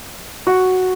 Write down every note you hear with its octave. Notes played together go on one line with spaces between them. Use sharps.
F#4